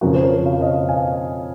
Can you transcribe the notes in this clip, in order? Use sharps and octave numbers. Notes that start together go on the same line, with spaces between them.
F2 C#3 F3 F#4 A#4
C5
A#4 C#5
C#5 F5
D#5
C#5 F5
F5 G#5